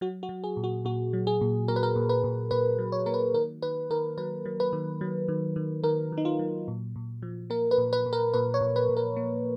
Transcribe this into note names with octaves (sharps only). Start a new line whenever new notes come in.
F#3 F#4
F#4
F#3
G#4
A#2
F#4
A#2 F#4
F#3
G#4
A#2
A#2 A#4
B4
A#4
A#2
B4
A#2
A#2 B4
F#3
C#5
A#3 A#4
B4
D#3 A#4
D#3 B4
D#3 A#4
F#3 B4
F#3
B4
D#3
F#3
D#3
D#3
D#3 A#4
D#3
D#4
F4
F#3
A#2
A#2
F3
A#3 A#4
B4
A#2
B4
A#2
A#4
A#2 B4
C#5
A#2
B4
A#2
A#4
A#3